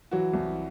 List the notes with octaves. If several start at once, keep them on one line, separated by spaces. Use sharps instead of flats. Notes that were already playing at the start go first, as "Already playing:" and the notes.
E3 F#3 F#4
C2